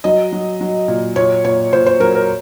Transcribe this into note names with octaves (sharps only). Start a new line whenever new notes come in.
F#3 D#5
F#3
F#3
A#2
A#2 C#5
A#2 C#5
A#2 C5
C5
F#3 A#4
A#4